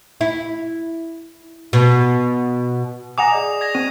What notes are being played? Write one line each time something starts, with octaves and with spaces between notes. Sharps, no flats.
E4
B2
F#5 G#5 A#5 D6 D#6 A#6 E7 F7
G#4 D5 D#5
G#6 A#6
C4 D#7